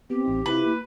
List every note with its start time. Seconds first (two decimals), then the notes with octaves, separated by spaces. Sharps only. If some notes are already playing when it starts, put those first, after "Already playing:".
0.10 B3 C4 G4
0.25 A1 D#4
0.46 C3 C4 E4 F4 B4
0.66 A#3